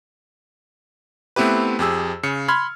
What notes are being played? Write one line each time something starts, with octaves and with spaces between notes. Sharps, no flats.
A3 B3 C4 E4 G4 B4
F2 G4 G#4 E6
C#3 C#7
B5 C6 F6 G#6